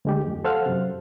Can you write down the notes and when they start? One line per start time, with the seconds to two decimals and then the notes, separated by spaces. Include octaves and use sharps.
0.05 D2 G#3 G4
0.27 F2
0.45 A4 C5 F5 F#5 F6
0.66 F#2 C3